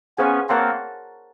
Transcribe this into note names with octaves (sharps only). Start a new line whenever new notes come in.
B3 C#4 G#4 C5 F5 G#5 C#6
A#3 C4 A#4 C#5 F#5 A5 C6